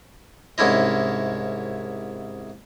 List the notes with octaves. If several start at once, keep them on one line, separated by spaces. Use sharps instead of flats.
C2 G#2 C#4 E4 D#5